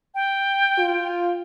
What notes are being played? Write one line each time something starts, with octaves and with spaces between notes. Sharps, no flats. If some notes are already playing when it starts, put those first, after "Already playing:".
G5
F4